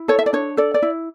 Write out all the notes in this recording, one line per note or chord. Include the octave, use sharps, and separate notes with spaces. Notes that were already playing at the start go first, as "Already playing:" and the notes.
Already playing: E4
A4 C#5
E5
D5
D4 C#5
A4 D5
D5
E4